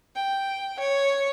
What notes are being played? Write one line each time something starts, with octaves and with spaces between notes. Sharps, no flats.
G5
C#5